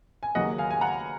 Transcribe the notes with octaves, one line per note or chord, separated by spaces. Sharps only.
G#5
D#2 C#3 F#3 A#3 D#5 F#5
F5 G#5
G#5
F#5 A#5